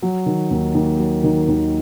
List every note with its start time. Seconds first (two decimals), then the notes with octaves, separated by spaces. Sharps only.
0.02 F#3
0.26 D#3
0.51 D#2
0.75 D#2
0.99 F#3
1.24 D#3
1.48 D#2